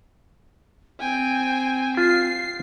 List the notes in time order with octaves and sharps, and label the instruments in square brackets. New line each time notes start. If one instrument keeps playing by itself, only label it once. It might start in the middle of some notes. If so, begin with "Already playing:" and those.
[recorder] C4 [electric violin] G5 G#5
[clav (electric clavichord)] F4 [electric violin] C7